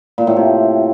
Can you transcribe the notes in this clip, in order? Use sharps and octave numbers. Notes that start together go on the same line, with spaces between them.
A#2
A2
C3